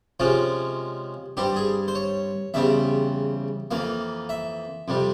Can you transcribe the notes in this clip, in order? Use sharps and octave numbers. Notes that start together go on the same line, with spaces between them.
C3 F3 G#3 C#4 F4
G2 G3 C4 G4
G#4
C5
C#5
E2 C#3 G3 C4 E5
F2 E3 A#3 F5
E5
F2 C3 G3